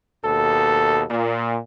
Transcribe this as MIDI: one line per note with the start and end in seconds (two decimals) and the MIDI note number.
0.25 1.04 39
0.25 1.04 47
0.25 1.04 69
1.10 1.58 46